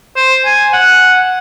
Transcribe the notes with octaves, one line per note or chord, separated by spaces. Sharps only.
C5
G#5
F#5